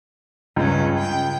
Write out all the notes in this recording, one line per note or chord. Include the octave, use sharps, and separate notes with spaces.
C#2 G2 C#4
G5